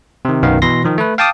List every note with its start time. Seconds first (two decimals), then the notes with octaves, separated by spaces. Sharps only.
0.25 C3 D#3
0.43 B1 F#2 D#3 B3 F5
0.62 B2 E3 C6 A#6
0.84 D#3 F3
0.98 A3 B4
1.18 F5 G5 A5 D6 D#6